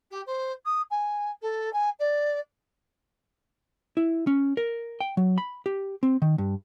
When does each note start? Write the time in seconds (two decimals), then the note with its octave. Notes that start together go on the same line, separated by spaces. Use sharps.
0.11 G4
0.26 C5
0.65 D#6
0.90 G#5
1.42 A4
1.73 G#5
1.99 D5
3.97 E4
4.27 C#4
4.57 A#4
5.00 G5
5.17 F#3
5.38 B5
5.66 G4
6.03 C4
6.22 D#3
6.38 G2